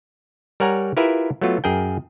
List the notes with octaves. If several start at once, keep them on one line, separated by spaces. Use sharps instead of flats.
G3 A#4 C#5 F#5 G#5 A#5
E4 F4 G4 A#4 B4 E5
F#3 A3 B3 F4 F#4
F#2 G#4 A#4 G5